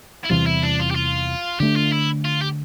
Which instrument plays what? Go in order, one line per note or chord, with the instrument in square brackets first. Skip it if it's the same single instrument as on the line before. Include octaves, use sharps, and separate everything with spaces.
[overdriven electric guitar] E4
[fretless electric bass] E2 C3 E3 G3 [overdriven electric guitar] F4
[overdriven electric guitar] E4
D4
F4
G4
F4
[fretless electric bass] D3 A3 D4 [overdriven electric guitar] G4
[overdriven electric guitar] F4
E4
F4
G4